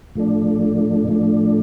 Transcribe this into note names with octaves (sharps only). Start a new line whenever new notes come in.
A2 F3 A3 D4
A2 F3 A3 D4